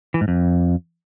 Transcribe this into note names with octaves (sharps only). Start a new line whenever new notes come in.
E3
G#2
F2